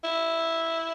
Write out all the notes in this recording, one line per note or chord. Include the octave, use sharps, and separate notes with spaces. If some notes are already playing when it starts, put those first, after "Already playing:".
E4